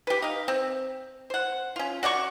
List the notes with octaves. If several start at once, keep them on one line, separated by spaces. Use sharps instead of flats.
G4 B4
D#4 F5
C4
C5 F#5
C#4 F4
F#4 D5 F#5 C#6